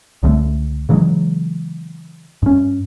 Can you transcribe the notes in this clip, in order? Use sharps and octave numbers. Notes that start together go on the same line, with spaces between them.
C#2 D3 G3 A3
C#3 E3 F#3 G#3
G2 C#4